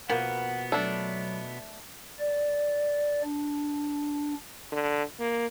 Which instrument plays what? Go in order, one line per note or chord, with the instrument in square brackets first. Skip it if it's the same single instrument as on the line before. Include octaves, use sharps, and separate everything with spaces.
[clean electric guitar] B2 B3 [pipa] F3 A#3 A#4 [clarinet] F#5
[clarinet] F#3 [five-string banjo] A3 D4
[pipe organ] D5
D4
[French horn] D3
A#3